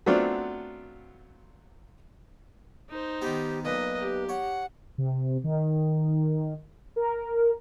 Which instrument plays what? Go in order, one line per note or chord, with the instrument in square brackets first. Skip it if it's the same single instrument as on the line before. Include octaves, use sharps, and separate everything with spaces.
[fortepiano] F#3 A3 B3 C4 D4 F4
[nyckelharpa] D#4 C5
[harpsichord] D#3 B3 [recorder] G4
[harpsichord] B1 A#2 [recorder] B4 [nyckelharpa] D#5
[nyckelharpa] G4
[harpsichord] C#5 [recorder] F#5
[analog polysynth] C3
D#3
A#4